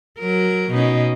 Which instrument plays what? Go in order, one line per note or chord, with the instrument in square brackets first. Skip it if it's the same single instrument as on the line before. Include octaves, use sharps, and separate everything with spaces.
[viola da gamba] F#3 A#4
B2 C#4 D#4